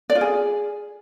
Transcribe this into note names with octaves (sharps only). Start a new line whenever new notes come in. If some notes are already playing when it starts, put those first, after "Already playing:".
D5
F4
G#4